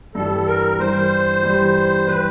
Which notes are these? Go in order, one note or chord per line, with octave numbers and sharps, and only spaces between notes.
G2 E3 G3 A4
A#4
G2 E3 G3 C5
G2 E3 G3
E3 G3 B4